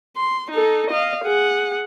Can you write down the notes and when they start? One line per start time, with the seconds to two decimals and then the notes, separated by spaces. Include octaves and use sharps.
0.17 C6
0.51 D#4 A4
0.90 D#5 F5
1.24 G#4 F#5